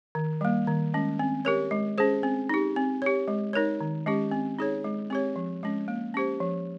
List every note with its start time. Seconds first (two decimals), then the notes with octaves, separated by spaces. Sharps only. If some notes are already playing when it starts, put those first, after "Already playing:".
0.15 D#3
0.41 G3 A#3
0.67 D#3
0.94 G#3 C#4
1.19 C4
1.45 G4 A#4 C#5
1.71 G#3
1.98 C#4 G#4 C5
2.23 C4
2.49 D#4 G4
2.76 C4
3.02 G4 C#5
3.28 G#3
3.53 D#4 A#4 C#5
3.81 D#3
4.06 G#3 C#4 G4
4.31 C4
4.59 D#4 G#4 C#5
4.84 G#3
5.10 C4 G4 C#5
5.36 F3
5.63 G#3 C#4
5.88 A#3
6.14 C#4 G4 C5
6.40 F3